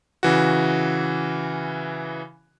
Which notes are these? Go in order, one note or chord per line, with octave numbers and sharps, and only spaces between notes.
C#3 E3 F#4